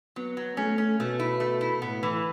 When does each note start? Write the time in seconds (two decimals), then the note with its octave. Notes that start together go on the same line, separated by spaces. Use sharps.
0.16 F#3 B3
0.37 F#3
0.57 A3 C#4
0.78 C#4
0.99 B2 A3
1.19 E4
1.40 A3
1.61 E4
1.82 A2 B3
2.03 E3